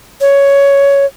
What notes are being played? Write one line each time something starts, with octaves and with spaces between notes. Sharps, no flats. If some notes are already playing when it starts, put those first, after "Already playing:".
C#5